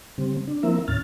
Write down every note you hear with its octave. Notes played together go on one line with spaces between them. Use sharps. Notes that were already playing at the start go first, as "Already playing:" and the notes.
C#3 G3 C4
D4
F3 A#3 C4 E4 A#4 E5
D#2 A2 C#4 F6 A6